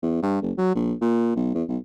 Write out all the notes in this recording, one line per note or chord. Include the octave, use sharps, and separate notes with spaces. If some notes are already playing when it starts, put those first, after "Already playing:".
E2
G2
F#1
F#3
A#1
A#2
B1
E2
B1